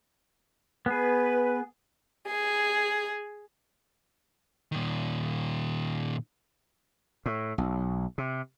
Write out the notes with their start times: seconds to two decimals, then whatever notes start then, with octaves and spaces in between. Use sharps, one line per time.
0.86 B3 G#4 B4
2.27 G#4
4.72 A#2 D#3
7.26 A2
7.58 B1
8.18 C3